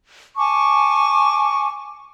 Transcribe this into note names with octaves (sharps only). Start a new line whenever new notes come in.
G#5 A5 C#6 D6